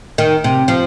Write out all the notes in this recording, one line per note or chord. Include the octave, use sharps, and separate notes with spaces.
D#3
C3
F3